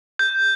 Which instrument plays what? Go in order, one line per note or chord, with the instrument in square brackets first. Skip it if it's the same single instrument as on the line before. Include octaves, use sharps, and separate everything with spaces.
[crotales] G6